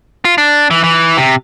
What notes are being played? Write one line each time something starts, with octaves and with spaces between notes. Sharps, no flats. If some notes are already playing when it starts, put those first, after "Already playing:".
F4
D4
E3
E3
C3